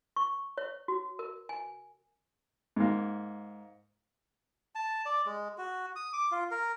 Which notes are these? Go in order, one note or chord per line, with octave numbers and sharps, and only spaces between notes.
C#6
C#5
F#4
A#4
G#5
G#2 A#3
A5
D5
G#3
F#4
D#6
D6
F4
A#4